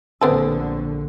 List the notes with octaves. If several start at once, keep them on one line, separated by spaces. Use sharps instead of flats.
A#1 D3 B3 C4 A4